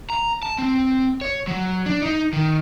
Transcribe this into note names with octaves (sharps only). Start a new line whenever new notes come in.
A#5
A5
C4
C#5
F#3
D4
D#4
D#3